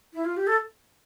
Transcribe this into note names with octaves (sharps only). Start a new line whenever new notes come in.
E4
F4
G4
A4